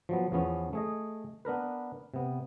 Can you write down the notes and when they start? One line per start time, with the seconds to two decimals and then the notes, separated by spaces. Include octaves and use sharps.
0.09 F3 F#3 B3
0.32 E2 F3 B3 C#4
0.73 A3 G#4 D#5
1.45 B3 D4 A#4 B4
2.14 C3 B3